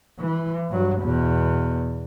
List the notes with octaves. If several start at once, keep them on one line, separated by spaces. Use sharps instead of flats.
E3
G2 F#3
E2 B2